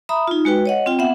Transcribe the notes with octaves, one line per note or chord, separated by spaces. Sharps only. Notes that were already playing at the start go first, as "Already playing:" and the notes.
E5 A#5 B5 D#6
D#4 F4
G#3 F#4 B4 G5
C#5 D#5 F#5
C4 F4 G5
B3 E5 F#5